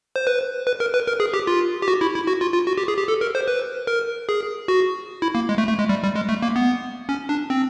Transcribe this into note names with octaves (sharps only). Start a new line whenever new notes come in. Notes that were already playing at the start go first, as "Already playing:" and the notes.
C5
B4
B4
A#4
B4
A#4
G#4
G4
F4
G4
F#4
E4
E4
F#4
F4
F4
F#4
G4
G#4
G4
A4
A#4
C5
B4
A#4
G#4
F#4
E4
A#3
G#3
A3
A3
G#3
G3
G3
G#3
A3
A#3
B3
C#4
D4
C4